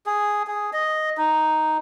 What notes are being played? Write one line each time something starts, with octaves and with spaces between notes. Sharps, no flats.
G#4
G#4
D#5
D#4